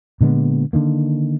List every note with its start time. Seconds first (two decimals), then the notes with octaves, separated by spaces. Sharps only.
0.21 A#2 D3 G#3 B3
0.73 D3 D#3 A#3